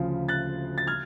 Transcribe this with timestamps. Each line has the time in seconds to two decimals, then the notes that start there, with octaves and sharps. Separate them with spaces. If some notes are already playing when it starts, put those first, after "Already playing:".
Already playing: D2 C#3 F3
0.29 F#6 A6
0.78 A6
0.87 F6 G#6